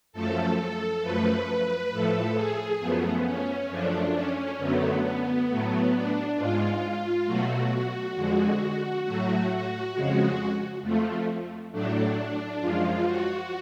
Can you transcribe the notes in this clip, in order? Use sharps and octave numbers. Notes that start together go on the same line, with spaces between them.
F#2 F3 A3 A4
A4
F#2 F3 A3 B4
A2 F3 A3 A4
G#4
F#2 F3 A3 B3
C#4
F#2 F3 A3 D4
C#4
F#2 D3 F#3 A3 B3
B3
A2 F#3 A3
D4
G#2 G#3 F4
B2 F#3 A3 F#4
F#4
F2 D3 G#3
A2 F#3 A3 F#4
F2 C#3 G#3
F2 F3 A3
A2 F#3 A3 D4
F#2 F3 G#3 F4
F#4